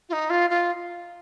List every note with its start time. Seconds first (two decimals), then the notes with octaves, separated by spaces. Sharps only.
0.09 F4
0.13 D#4
0.30 F4
0.50 F4